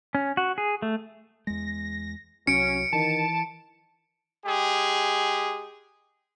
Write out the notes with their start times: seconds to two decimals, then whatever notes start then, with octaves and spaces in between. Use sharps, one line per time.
0.15 C#4
0.37 F#4
0.58 G#4
0.82 A3
1.47 E2 G#3 A#6
2.47 C2 F#3 C#4 C#7 D7
2.93 D#3 E3 A5
4.46 G#3 G4 G#4